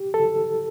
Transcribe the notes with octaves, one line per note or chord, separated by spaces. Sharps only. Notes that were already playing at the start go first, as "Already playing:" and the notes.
Already playing: G4
A4